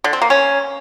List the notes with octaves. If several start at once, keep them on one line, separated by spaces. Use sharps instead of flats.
D3
C4
A#3
C#4